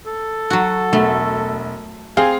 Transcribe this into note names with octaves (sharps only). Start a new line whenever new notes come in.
A4
F#3 F#4
E1 A3
C4 G#4 F5 G#5